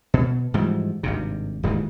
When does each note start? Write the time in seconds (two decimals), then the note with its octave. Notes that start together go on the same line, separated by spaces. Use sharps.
0.14 B2
0.54 G#2 E3 F3 G3
1.03 G#1 G2 C3
1.63 D#1 G#2 D#3 E3